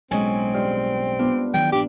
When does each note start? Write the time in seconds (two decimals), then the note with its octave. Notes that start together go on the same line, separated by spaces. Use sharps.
0.11 B1 A2 G#3 C4 C#4 G#5
0.54 G2 F4
1.19 B3 D4 F4
1.54 D#3 E3 F#3 G5
1.72 A#1 D4 G4